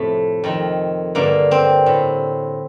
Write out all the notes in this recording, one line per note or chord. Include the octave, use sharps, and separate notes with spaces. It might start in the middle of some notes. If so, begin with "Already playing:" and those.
Already playing: F2 A2 C3 A3
F2 D#3
G2 D3 A#3
C4
A2